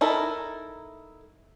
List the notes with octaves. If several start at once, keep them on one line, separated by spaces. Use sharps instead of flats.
D#4 E4 A4 A#4